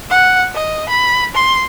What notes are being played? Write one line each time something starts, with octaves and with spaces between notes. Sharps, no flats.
F#5
D#5
B5
C6